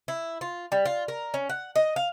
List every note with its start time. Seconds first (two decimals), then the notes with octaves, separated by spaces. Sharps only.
0.08 E4
0.41 F4
0.72 G3
0.86 F4
1.08 A#4
1.34 C#4
1.49 F#5
1.76 D#5
1.96 F5